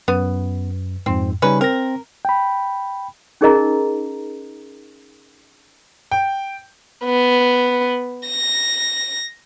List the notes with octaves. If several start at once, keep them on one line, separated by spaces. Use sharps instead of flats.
F#2 B3
F2 G#2 C4
C#3 G3 C#4 D#4 B4
C4 A#4 A#6
G5 B5
C#4 D#4 G#4 A#4 D#5 A#5
G5
B3
A#6